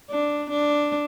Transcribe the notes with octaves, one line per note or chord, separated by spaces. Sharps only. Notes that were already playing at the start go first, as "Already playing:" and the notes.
D4
D4